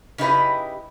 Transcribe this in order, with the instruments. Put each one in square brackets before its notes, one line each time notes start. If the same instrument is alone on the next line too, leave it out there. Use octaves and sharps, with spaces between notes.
[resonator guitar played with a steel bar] C#3 D#4 E4 G4 B4 D#5